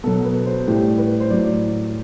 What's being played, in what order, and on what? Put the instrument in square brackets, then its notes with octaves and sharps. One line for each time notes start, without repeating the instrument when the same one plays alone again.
[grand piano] B2 F#3 A4
B4
C5
A2 G3 G4
B4
C5
A2 F#3 D5